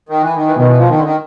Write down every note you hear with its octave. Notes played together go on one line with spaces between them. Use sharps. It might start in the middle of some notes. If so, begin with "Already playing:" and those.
D#3
E3
D#3
E3
B2 D#3
E3
F3
D#3
D3
D#3